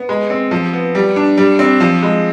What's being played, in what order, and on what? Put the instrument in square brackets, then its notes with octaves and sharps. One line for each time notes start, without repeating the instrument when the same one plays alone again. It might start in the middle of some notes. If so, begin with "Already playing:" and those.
Already playing: [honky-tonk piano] B3
G#3
C4
F3
B3
G3
D4
G3
C4
F3
G#3